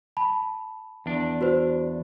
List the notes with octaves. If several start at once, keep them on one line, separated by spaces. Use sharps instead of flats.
A5 B5
E2 D4
F#4 B4 C5